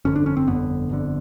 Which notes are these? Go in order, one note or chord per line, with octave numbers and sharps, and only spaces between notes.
G1 F2 D3 C#4
D4
C#4
C4
G1 F2 D3 B3
G1 F2 D3